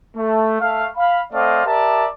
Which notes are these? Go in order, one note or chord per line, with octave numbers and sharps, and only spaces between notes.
A3
A3 F5
F5 B5
A3 C4 C5 D5 D#5 F5
G4 A#4 D5 E5 A5